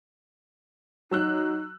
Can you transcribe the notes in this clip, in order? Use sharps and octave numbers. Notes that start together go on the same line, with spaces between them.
F#3 D#4 E6 F#6